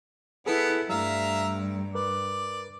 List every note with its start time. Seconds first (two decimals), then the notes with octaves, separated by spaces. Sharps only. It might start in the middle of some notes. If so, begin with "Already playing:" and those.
0.46 B3 E4 G#4 A4 B4
0.89 G2 G3 A3 E5 F5 A#5
1.95 A#4 B4 D5